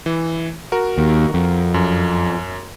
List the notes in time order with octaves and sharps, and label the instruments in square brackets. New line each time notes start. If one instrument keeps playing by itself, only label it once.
[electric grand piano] E3
F#4 A#4
[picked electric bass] D#2
F2
[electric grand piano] F#2